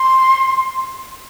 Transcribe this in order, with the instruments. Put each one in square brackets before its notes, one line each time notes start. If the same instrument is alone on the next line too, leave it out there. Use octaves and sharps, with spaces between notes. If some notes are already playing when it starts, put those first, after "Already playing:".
Already playing: [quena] C6